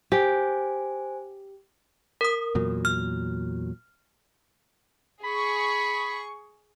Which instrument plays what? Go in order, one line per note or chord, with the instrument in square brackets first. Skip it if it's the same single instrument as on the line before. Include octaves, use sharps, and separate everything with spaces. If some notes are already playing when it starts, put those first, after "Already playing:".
[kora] G4 [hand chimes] C5 G#5
[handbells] A#4 D#6
[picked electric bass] E2 A#2 F#3
[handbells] F6
[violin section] G#4 C#6 [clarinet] B5